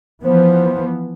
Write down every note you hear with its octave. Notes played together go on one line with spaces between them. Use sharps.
E3 F3 B3 C5